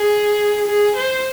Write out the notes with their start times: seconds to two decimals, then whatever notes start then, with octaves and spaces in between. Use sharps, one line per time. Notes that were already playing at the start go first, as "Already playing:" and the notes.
Already playing: G#4
0.68 G#4
0.97 C5